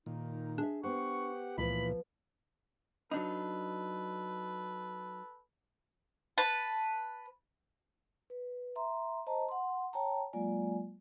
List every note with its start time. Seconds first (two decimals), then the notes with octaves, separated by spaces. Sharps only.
0.06 A#2 D#3 D#4
0.58 D4 G#4 E5
0.84 B3 G4 C5 F#5 C#6
1.58 C#2 A#2 E3 F3 B4 B5
3.11 F#3 D4 D#4 A4 B4
6.38 B4 A5
8.30 B4
8.76 E5 A#5 C6
9.27 C5 D#5 A5 A#5
9.49 F#5 C6
9.93 C#5 G5 A5 A#5
10.33 F#3 G#3 A#3 F4 D5 G#5